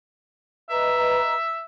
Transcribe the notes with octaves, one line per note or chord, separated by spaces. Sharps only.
B4 D#5 E5 A#5